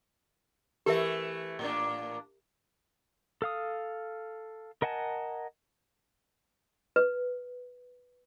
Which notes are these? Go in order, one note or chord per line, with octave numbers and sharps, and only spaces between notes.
E3 A3 G4 A4 A#4 E5
A2 A#3 D4
A4 F5 D#6
A#4 D#5 F#5 G#5 A5
B4